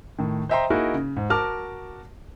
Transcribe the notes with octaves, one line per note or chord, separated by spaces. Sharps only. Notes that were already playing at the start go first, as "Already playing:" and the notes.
A2 D#3
C5 D#5 E5 G5 A#5 C6
A#3 D#4 E4 F#4 G#4 A#4
C#3
G#2
F#4 A#4 A5 D6 F6